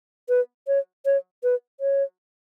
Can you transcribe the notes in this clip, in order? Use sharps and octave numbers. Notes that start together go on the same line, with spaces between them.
B4
C#5
C#5
B4
C#5